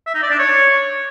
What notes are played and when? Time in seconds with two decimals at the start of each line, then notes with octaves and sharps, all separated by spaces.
0.07 E5
0.15 D#4
0.23 D5
0.31 D4
0.39 C#5